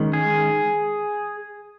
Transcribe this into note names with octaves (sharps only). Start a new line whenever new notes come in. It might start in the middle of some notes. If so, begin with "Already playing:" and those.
Already playing: D#3 G#3 C#4
G#4